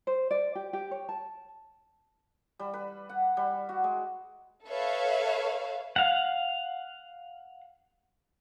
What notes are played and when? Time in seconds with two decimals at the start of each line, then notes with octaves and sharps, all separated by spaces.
0.07 C5
0.31 D5
0.55 G4
0.73 G4
0.91 C#5
1.09 A5
2.59 G3
2.74 B4
3.09 F#5
3.37 G3
3.69 F#4
3.84 G#3
4.67 A4 B4 C#5 E5 F5
5.96 F5 F#5